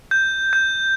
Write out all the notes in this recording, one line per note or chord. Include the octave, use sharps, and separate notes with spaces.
G6
G6